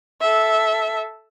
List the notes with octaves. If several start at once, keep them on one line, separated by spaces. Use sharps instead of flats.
A4 E5